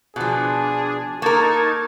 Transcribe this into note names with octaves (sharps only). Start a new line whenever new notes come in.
B2 F3 D4 G#4
A#3 D#4 A#4 A5 C#6 G#6